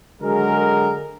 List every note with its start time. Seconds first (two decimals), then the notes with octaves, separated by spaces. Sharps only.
0.22 D3 F#3 G#3 F#4 G#4 A#4